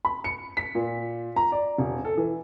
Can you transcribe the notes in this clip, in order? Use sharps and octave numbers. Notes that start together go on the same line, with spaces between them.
B5
C#7
B6
A#2
A#5
D5
E1
A4
E3